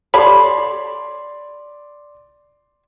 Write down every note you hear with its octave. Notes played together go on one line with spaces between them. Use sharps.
G4 A4 C#5 D5 B5 C6